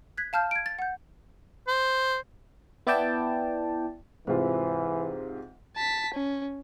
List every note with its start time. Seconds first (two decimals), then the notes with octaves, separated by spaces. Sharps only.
0.18 F#6 G#6 B6
0.33 F5 A5 F6 G6
0.51 G#6 D7
0.66 A6
0.79 F#5 G6
1.68 C5
2.87 B3 E4 D5 G5 A5
4.27 G#2 C3 E3 F4 C5
5.76 A5 B6
6.14 C#4